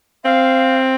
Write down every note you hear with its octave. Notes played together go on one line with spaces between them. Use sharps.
C4 F5